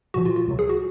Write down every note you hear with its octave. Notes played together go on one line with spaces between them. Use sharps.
C2 A#2 F3 F#4
F4
F4
C#2 C3 F#3
G#4
F#4